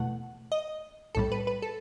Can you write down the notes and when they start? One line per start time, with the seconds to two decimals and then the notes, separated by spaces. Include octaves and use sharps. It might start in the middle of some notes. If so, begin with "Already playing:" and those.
Already playing: E2 B2 A3 F#5
0.52 D#5
1.15 B1 A2 G3 A4
1.32 B4
1.47 B4
1.62 A4